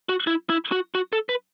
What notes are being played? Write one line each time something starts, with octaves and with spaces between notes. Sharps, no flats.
F#4
E4
E4
F#4
F#4
A4
B4